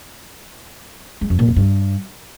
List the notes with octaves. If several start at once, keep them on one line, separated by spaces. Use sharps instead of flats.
G#3
F2
A#2
F2
G2